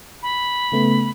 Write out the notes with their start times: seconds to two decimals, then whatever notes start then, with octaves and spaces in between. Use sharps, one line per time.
0.23 B5
0.72 C#3 A3 B3